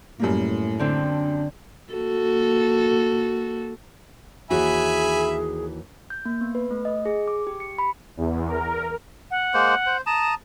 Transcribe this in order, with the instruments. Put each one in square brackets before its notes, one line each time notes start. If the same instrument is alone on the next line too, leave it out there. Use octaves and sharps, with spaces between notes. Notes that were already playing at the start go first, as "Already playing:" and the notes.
[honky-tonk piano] F#2 G3 A#3 [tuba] A2
[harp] D3 C4 [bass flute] D4
[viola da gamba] A#3 F#4 A4
[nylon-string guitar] D#2 E3 F#4 [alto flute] G#4 [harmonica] E5 G#5 B5
[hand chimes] G6
A#3
B3
B4
A3
D#5
G#4
D6
G4
C#7
B5
[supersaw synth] E2
A#4
[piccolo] F#5
[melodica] G#3 A#3 C5
C5
[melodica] A5 A#5 D#6 [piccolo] E7